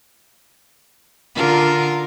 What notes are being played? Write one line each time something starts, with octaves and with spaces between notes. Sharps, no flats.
D3 F4 A#4